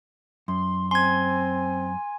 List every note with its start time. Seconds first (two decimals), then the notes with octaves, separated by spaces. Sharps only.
0.48 F#2 C6
0.91 C4 G#5 C6 G#6